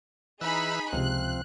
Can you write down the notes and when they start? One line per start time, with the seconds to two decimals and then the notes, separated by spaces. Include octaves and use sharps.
0.41 E3 D#4 G#4 B5 E6 F#6
0.93 C#2 C3 F3 C4 F#6